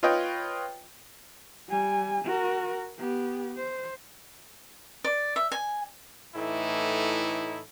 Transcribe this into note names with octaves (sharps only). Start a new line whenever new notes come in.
F4 B4 C#5 D#5 G5
G3 G#5
F#4 A#4
B3 G4
C5
D5
E5
G#5
A2 E3 A3 D#4 E4